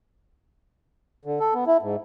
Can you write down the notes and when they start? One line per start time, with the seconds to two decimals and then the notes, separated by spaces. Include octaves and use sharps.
1.25 D3
1.40 A4
1.54 B3
1.67 E4
1.82 G#2